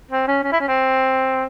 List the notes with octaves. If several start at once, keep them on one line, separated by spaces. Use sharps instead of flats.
C4
C#4
C#4
E4
C#4
C4